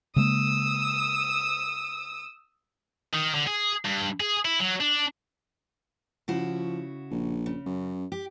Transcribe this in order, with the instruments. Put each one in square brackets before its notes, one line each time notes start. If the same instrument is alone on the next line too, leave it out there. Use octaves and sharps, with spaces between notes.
[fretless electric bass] C#3 G#3 A#3 [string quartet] D#6 E6
[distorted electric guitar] D#3
D3
G#4
G2
G#4
E4
F#3
D4
[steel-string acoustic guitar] C#3 E4 F#4 [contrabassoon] F3
[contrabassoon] A#1
[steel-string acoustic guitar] C#3
[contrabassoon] F#2
[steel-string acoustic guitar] G4